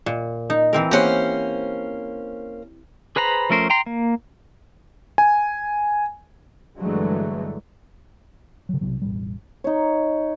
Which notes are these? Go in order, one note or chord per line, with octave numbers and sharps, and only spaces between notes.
A#2
D#4
E3 C4 A#4
A#3 C#4 G4 C5 F#5
G#4 B4 C5 A#5 B5
F3 A3 C#4 A#4 C5
G5 A#5 C6
A#3
G#5
G2 D3 E3 F#3 G#3 A3
C#3 F#3
B1 C3 F#3
E1 A1 G3
D#4 C#5